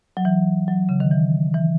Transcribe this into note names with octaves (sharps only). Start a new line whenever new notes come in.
F#3
E3
F#3
C#3
D#3
E3
E3